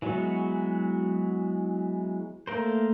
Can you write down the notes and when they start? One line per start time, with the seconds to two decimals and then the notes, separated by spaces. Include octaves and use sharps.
0.02 E3 F#3 G#3 B3 F#4
2.47 A3 A#3 A#4 C5